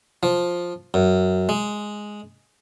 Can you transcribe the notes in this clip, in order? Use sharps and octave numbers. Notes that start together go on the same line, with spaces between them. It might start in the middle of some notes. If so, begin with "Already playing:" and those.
F3
F#2
G#3